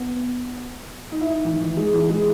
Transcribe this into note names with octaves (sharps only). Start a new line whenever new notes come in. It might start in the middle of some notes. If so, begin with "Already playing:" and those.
Already playing: B3
D#4
E4
D#4
E3
D#3
E3
G#3
E3
G#3